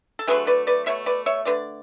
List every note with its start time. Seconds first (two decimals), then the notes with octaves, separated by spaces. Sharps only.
0.19 A4
0.27 D3 F#3 A3 G#4 B4
0.47 B4 D5
0.67 B4 D5
0.86 B2 A3 C#5 E5
1.06 B4 D5
1.26 C#5 E5
1.45 D3 A3 B4 D5